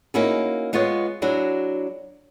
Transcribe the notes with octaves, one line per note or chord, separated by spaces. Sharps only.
A#3 C#4 D#4 E4 F#4 G#4
G#3 B3 F4 G#4 C#5
F#3 D4 E4 F#4 G#4